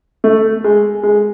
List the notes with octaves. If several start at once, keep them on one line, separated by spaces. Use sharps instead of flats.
A3
G#3
G#3